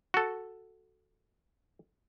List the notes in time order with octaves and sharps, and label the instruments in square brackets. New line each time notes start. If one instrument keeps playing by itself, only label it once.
[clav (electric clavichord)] F#4 A4